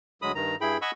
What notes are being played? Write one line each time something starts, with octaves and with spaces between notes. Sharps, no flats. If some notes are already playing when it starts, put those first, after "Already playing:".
D2 F#3 G#3 B5 D#6
G2 D#3 A#5
G2 E4 G#4 G5 B5
D#5 F#5 G#5 B5 C#6 E6